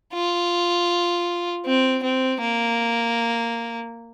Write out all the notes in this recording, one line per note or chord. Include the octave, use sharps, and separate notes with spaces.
F4
C4
C4
A#3